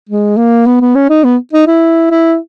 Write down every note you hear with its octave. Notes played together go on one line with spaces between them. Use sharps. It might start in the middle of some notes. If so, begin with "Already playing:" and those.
G#3
A#3
B3
B3
C#4
D#4
B3
D#4
E4
E4